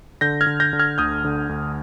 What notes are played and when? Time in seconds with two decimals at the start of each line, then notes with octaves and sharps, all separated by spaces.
0.21 D3 G6 A#6
0.41 F6 G#6
0.46 D3
0.60 G6 A#6
0.73 D3
0.79 F6 G#6
0.98 D2 D#6 G6
1.25 D3
1.49 D2